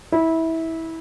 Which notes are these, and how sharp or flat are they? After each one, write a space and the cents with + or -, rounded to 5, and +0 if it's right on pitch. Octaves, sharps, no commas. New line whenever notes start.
E4 -20